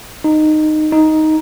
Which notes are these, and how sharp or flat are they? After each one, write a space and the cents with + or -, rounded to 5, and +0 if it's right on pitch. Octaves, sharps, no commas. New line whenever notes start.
D#4 -15
D#4 +5